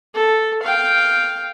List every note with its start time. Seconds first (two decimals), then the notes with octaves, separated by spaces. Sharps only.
0.15 A4
0.63 F5 G5